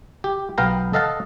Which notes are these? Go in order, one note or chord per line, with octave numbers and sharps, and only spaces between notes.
G4
B1 B3 F5 G5 A#5
A4 D#5 F5 F#5 A5